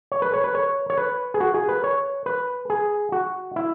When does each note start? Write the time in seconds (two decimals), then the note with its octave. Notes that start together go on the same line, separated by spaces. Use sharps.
0.12 C#5
0.22 B4
0.34 C#5
0.44 B4
0.55 C#5
0.90 C#5
0.97 B4
1.34 G#4
1.40 F#4
1.54 G#4
1.69 B4
1.84 C#5
2.26 B4
2.70 G#4
3.12 F#4
3.56 E4